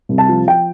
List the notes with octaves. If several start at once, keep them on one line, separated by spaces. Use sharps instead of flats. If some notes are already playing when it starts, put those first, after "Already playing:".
C2
A5
F3
F3 G5